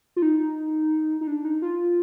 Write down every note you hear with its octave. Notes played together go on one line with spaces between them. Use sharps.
F4
D#4
D#4
D4
D#4
F4